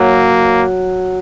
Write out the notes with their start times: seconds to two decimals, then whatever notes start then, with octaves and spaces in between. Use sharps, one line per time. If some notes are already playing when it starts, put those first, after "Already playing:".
Already playing: F#3 A#3